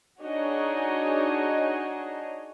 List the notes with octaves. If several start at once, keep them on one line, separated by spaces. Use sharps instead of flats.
D4 D#4 F#4 G#4 C#5 D#5